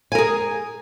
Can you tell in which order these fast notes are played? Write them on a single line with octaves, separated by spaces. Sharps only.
G#5 A#4 G#4